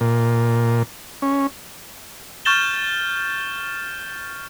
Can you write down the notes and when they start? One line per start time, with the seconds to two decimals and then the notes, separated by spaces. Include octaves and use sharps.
0.01 A#2
1.22 C#4
2.45 C#6 F6 G6 A6 E7 G7